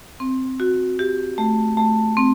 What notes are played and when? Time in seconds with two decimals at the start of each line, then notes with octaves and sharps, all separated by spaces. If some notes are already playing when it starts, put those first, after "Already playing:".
0.20 C4
0.60 F#4
0.99 G4
1.38 A3
1.77 A3
2.17 C4